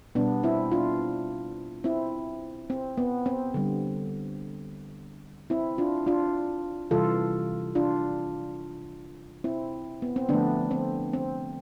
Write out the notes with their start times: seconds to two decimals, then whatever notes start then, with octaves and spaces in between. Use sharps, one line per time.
0.15 B2 G3 B3 D4
0.43 C4 E4
0.72 D4 F4
1.84 C4 E4
2.70 C4
2.98 B3
3.26 C4
3.54 D3 G3
5.50 C4 E4
5.78 D4 F4
6.07 D4 F4
6.91 C3 E3 G3 F4 A4
7.75 D4 F4
9.44 C4 E4
10.02 B3
10.16 C4
10.29 D3 F3 A3 B3 D4
10.71 C4
11.13 C4